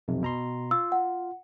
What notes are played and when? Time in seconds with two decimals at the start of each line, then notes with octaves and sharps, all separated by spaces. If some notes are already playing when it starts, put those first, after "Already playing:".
0.08 B1 F2 C3
0.23 B2 A#5 C6
0.71 F4 E6
0.92 F#5